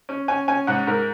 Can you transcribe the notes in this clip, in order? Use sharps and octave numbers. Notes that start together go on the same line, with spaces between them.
C#4
C#4 G#5
C#4 G#5
G#2 F#5
G#2 A#4